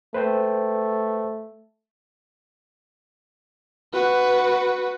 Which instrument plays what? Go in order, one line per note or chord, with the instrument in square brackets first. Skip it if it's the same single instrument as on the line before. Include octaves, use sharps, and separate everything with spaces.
[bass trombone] A3 [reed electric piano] B4 C5 G5
[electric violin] F#4 B4